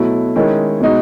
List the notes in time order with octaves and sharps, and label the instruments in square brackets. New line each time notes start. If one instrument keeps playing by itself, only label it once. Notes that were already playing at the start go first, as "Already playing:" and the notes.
Already playing: [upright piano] B2 F#3 A3 E4
D#3 G#3 C#4 E4
B2 G#3 D#4 F#4